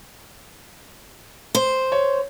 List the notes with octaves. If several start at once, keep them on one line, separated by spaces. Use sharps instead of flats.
C5
C#5